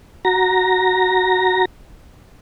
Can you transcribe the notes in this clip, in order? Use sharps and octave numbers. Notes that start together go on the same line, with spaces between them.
F#4 A#5 A#6